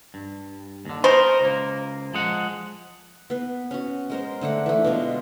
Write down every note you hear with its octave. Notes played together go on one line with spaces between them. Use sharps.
G2
D#2 D3
D#4 A#4 C5
C#2 A#3
F3 G#3 F#5
B3 B4
C#4 F#4
G#3 A#4 C5
D3 A3 D4 F#5
E3 A3
B2 G#3 F4